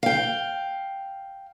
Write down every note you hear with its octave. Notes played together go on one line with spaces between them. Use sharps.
F5 G5